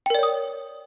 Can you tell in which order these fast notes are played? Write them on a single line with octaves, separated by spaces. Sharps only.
G5 A#4 D5 C#5 D#6